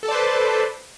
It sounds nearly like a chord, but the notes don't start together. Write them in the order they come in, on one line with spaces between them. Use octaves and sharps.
A4 A5 D5 C5 B4